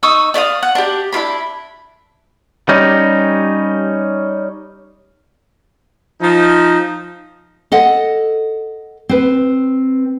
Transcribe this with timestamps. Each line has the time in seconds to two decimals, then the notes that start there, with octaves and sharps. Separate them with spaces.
0.03 D#4 C#6 D#6 E6
0.34 D5 E5 F5 D#6
0.63 F#5
0.75 D4 G4
1.12 D4 E4 F4 B5
2.69 G3 C#4 D#4
6.21 F3 D#4
7.72 A4 D#5 F#5
9.09 C4 B4